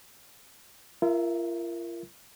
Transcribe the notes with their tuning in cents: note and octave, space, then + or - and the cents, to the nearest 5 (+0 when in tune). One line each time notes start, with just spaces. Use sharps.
F4 -40 A#4 +0 E5 +0